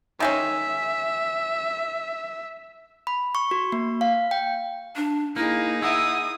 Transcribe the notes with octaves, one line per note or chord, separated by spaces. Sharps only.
D#3 G#3 C#4 E5
B5
C#6
F#4
A#3
F5
G5
D4
A#3 D#4 E4 G#4
E4 E5 F#5 D#6